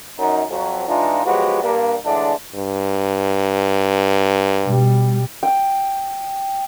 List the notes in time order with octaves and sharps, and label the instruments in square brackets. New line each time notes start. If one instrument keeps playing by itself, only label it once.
[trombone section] F#2 D#4
F2 F#3
E3 G#3 D4 D#4 F4
F3 F#3 G#3 B3 F#4 G4
G2 A#3
A2 D3 E3 G#3 D4
[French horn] G2
[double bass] B2 G3
[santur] G5